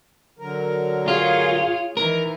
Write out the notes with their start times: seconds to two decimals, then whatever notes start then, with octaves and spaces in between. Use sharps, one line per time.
0.39 D3 F#3 A#4
1.08 F4 G#4 C#5 F5
1.97 D#3 E3 A#4